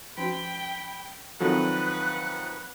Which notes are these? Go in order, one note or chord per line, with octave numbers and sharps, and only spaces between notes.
F3 C#4 F#4 G5 B5
D#3 F3 F#3 C4 F#4 A4 B4 F#5